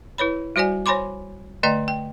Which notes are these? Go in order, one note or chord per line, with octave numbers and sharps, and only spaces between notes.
E4 B4 C#5 B5
G3 F#4 C5 D5 G#5
C5 C#5 G#5 B5 C6 D6
D3 A3 D5 D#5 G5 A#5
G5